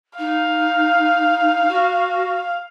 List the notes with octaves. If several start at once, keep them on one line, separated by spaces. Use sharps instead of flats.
D#4 F5
F#4